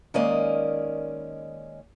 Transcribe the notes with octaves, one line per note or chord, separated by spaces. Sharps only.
D#3 G#3 A#3 C#4 D5 D#5